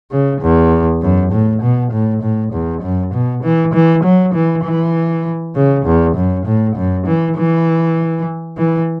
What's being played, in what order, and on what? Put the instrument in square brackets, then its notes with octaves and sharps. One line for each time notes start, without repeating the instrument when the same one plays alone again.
[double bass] C#3
E2
F#2
A2
B2
A2
A2
E2
F#2
B2
E3
E3
F#3
E3
E3
C#3
E2
F#2
A2
F#2
E3
E3
E3